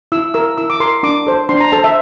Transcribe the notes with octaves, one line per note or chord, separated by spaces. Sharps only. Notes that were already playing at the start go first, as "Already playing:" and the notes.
E4 E6
A#4 E6
E4 E6
D6
A#4 C6
D4 D6
A4 C5
D4 C6
A#5
A4 C5 A5
E5